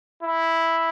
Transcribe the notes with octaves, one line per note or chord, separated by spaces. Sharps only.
E4